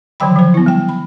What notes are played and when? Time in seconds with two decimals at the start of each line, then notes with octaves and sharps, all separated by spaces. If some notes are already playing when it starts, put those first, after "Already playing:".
0.20 D3 D#3 F3 F#3 G5 B5
0.36 F3 C5
0.54 B3 E4
0.66 G3 G5
0.89 B5